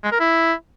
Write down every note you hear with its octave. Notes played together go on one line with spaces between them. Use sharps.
G#3
A#4
E4